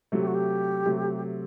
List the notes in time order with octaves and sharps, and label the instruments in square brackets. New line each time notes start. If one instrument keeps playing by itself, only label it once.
[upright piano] C3 F#3 A3
[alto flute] G4
F#4
G4
[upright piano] C3 F#3 A3